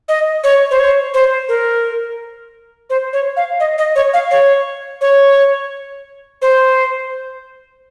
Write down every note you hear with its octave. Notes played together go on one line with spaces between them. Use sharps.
D#5
C#5
C5
C#5
C5
A#4
C5
C#5
F5
D#5
D#5
C#5
F5
C#5
C#5
C5